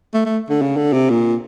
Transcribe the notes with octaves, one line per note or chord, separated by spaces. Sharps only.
A3
A3
D3
C#3
D3
C3
A#2